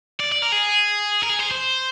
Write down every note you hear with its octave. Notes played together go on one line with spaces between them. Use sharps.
D5
D5
A#4
G#4
A#4
G#4
C5
C5